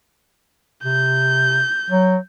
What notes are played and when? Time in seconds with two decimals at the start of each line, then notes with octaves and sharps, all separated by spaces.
0.84 C3 G6
1.90 F#3